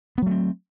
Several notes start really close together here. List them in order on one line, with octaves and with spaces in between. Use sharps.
B3 F#3 A3 C4